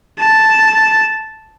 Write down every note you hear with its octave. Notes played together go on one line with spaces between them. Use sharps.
A5